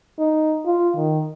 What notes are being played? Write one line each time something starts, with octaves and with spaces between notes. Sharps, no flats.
D#4
F4
D#3